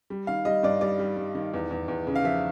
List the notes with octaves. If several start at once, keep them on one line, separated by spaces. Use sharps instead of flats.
G3
D#3 F5
G3 D#5
G2 D5
G3 D5
G3
G3
D#3
E2
E2
E2
C#3
F5
F3 E5